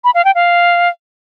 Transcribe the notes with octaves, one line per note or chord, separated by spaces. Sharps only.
B5
F5
G5
F5